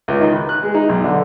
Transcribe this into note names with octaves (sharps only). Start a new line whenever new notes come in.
C#2
D#3
B4
F#6
G#3
D#4
B1
D3